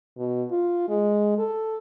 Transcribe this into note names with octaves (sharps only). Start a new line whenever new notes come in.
B2
F4
G#3
A4